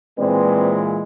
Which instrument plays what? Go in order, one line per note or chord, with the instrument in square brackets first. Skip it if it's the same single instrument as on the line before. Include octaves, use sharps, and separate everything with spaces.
[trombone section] A#2 E3 G#3 [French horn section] C4 B4 D5